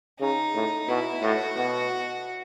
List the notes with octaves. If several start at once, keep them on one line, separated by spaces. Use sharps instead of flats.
C#3 D#4
A2
B2 E4
A2 F#4
B2